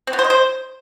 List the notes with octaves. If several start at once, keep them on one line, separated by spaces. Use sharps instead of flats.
C4
B3
C5
D#5
C5